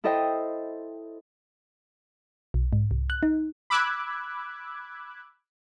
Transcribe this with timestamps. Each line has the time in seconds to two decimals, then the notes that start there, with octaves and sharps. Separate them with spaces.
0.04 E4 A4 C5 D#5 G5
2.54 B1
2.73 G#2
2.91 C2
3.10 F#6
3.23 D#4
3.70 B5 D6 E6 F#6 G#6